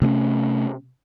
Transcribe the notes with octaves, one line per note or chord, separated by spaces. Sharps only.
C3 A3 A#3 C#4